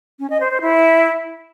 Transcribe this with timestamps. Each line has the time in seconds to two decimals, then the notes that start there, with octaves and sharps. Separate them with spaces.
0.19 C#4
0.30 D#5
0.40 C5
0.51 C5
0.61 E4